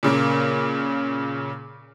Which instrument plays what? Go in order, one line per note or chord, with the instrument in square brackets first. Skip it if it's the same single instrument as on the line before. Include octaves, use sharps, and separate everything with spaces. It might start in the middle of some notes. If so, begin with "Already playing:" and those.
[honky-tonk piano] A#2 C#3 A#3